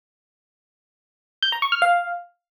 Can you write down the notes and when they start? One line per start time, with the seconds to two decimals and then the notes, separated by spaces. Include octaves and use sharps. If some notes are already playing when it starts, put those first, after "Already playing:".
1.43 G6
1.52 A#5
1.62 C#6
1.72 F6
1.82 F5